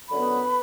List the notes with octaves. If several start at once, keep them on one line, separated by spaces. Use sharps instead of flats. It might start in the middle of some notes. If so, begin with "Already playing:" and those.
F#2 D3 B3 B4 B5